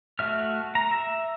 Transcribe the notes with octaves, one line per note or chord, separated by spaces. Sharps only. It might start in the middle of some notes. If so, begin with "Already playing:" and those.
A3 F#4 E5 F6
A#5
E5